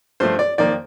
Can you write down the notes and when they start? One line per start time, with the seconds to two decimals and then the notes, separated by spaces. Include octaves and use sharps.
0.20 G2 F3 A3 C5
0.39 D5
0.58 F2 D#3 A#3 D5